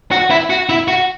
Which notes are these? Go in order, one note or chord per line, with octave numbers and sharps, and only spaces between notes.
F#4
E4
F#4
E4
F#4